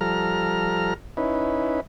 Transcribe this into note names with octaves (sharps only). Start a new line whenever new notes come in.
F3 G3 A4 A#5 F6
C#4 D#4 E4 B4